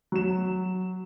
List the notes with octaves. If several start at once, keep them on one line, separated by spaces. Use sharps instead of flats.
F#3 E7